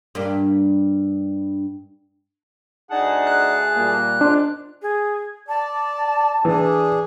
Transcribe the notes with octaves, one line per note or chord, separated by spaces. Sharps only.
G2 A#3 D4
D2 D4 D#4 G#4 F#5 A5
F#6
A#2 G3 A#3
G#2 D4 F4
G#4
D5 A5
E3 D4 G#4